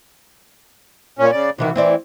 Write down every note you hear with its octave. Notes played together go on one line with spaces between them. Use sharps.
A#2 C#4
C#3 D5
C3 D#3 E3 F#4
E3 C4 E4 D5